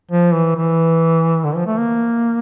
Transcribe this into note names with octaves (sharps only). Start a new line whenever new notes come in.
F3
E3
E3
D3
F3
A3
A#3